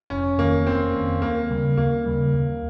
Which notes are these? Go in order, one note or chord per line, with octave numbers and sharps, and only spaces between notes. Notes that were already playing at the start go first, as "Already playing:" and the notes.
F1 C#4
F2 D#3 A#3
F1 C4
F2 D#3
D#2 A#3
C#3 G3
D#2 A#3
C#3 G3
D#2